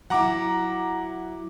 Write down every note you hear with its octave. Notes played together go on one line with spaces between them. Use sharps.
F#3 E4 F#5 A#5 D6